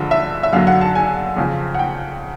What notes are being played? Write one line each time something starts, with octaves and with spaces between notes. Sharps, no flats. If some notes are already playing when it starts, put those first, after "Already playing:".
Already playing: G2 D3 F3 G#3
E5
E5
F#2 D3 F#3 F5
F#5
A5
G#5
F2 C#3 F3
F#5
G5